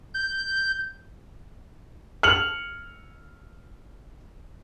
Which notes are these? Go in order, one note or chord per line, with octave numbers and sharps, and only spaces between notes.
G6
F6 C#7 F7 F#7